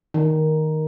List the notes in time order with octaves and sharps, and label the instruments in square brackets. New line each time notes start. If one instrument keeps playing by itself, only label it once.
[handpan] D#3